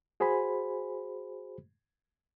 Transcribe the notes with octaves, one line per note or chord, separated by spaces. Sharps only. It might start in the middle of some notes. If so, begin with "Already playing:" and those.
F#4 G#4 C5 G#5 B5